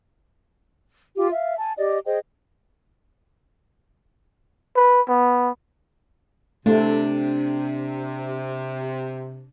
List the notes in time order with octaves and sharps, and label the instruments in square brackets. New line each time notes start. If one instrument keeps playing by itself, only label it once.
[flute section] F4 G4 F5
E5 F5
G#5 A5
G4 D5 D#5
G#4 C5 D#5 G5
[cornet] B4
B3
[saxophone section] C3 [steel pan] A3 [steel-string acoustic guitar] D4